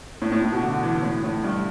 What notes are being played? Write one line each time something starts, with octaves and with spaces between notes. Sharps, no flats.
A2
A2
A2
B2
D3
E3
A2
A2
G2